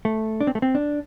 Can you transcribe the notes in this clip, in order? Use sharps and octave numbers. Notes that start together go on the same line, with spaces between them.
A3
D4
C4
A3
C4
D4